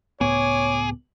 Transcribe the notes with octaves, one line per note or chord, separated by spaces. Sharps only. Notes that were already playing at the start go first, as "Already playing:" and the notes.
C#2 A2 B3 G#4 C#5 D6